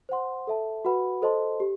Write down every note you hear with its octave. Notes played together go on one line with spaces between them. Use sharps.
C5 F#5 C6
A4 E5 A5
F#4 B4 F#5 B5
A4 C5 D#5 A5 C6
G4